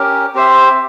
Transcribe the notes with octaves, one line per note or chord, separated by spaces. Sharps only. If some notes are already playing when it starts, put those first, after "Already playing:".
Already playing: C#4 G4 A#4
C4 G4 C5 E5